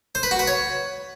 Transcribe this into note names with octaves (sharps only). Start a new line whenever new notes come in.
C5
B4
F#4
B4
C#5